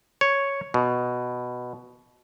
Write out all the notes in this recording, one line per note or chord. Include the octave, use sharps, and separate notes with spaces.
C#5
B2